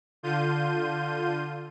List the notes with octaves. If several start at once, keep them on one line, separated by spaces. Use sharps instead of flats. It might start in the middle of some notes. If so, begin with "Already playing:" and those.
D3 F4 G6 D#7